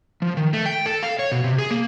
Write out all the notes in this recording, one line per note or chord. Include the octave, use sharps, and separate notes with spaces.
F3
D#3
A3
G5
A4
F5
C#5
B2
C3
G#4
A#3